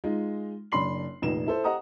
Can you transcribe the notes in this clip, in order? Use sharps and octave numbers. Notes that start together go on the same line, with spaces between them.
G#3 D#4 F4
F#1 D4 B5 C6 C7 F#7
F1 A#1 D#4 E7
E4 A4 C5
G4 D#5 F#5 A#5 D#6